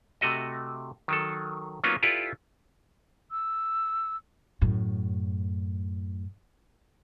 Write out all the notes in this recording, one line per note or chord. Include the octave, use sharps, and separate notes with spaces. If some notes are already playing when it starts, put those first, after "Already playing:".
C3 A3 F#4 D#5
D#3 F#3 A4
F#3 A#3 B3 C#4 D#4 F4
E4 F4 G4 A4 B4 D5
E6
F#2 A2